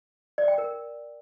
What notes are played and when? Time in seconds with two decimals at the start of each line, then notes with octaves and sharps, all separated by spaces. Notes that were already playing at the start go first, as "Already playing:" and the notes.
0.38 D5
0.48 G5
0.58 A#4